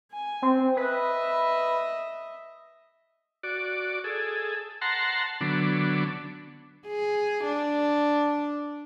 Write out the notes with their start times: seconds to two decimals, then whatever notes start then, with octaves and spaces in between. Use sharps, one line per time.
0.12 G#5
0.42 C4
0.77 B4 D#5 E5
3.43 F#4 D5
4.04 G#4 A4
4.82 F#5 A5 A#5 C6
5.41 D3 F#3 B3 D4
6.87 G#4
7.45 D4